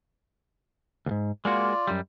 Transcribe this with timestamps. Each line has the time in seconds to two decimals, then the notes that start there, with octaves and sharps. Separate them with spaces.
1.06 D2 G#2
1.45 G#3 A#3 F4 F#4 D5
1.87 F#2 G3